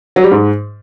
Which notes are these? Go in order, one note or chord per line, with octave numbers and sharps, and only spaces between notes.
F#3
G3
G#2